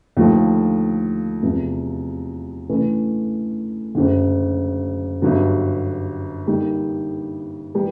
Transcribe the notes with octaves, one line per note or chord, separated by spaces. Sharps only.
D#2 D3 F3 A3
E2 C3 F3
C#3 E3 A3 D4
F#1 F#2 D3
G1 G2 D3 F#3
D3 G3 A#3 D#4
E3 G3 B3